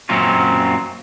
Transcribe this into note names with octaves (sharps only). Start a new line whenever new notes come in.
F#2 A#2 F#3 A#3 C4 C#4